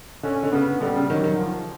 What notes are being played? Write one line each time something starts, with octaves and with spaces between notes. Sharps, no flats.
D3 C#4
D3
C#3 B3
D3 G3
C#3
D#3 F#3
D#3
F3